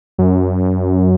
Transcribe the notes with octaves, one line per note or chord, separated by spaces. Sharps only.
F#2